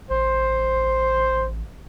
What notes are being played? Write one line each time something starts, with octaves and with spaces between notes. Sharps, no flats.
A1 C5